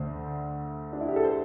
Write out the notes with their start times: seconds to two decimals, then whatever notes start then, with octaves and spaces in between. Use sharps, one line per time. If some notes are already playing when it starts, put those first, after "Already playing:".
Already playing: D2 D3 A3 C5
0.93 D4
1.01 E4
1.08 G4
1.16 A4
1.24 C5